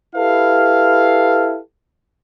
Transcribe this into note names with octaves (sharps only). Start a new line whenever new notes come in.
E4 G4 A4 B4 F5